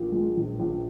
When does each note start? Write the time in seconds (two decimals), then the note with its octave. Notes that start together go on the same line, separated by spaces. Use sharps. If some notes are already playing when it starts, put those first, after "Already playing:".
Already playing: A#1 A#2
0.12 G#3
0.37 A#1
0.60 A#1